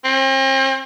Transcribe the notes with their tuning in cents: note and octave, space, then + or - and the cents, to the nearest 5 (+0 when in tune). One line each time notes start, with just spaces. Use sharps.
C4 +40